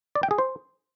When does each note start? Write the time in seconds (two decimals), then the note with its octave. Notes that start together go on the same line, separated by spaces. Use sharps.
0.15 D5
0.23 G5
0.31 G#4
0.38 C5